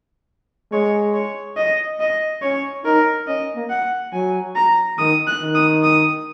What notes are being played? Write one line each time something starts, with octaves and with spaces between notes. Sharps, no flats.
G#3 C#5
C#5
D#5
D#5
C#4 C#5
D#4 A#4
C#4 D#5
A#3
F#5
F#3 G#5
A#5
D#3 D#6
F#6
D#3
D#6
D#6